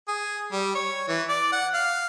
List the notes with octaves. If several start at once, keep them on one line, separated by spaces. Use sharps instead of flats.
G#4
G3
C#5
E3
D5
F#5
F5